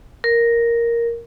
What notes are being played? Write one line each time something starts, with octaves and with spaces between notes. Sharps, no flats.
A#4